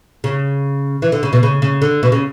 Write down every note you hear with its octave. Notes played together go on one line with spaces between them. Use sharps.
C#3
E3
D3
C#3
B2
C#3
C#3
D3
B2
C#3